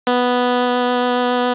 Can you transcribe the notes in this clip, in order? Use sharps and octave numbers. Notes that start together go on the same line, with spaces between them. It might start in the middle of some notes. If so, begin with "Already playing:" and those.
B3